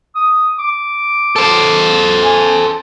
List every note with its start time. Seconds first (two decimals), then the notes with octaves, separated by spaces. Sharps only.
0.15 D#6
0.59 D6
1.36 A4 C5
2.24 G#5